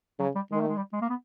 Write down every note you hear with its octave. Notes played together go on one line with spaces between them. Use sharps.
C#3 F#3
G3
D#3 G#3
A3
G#3
G3
G#3
A#3
B3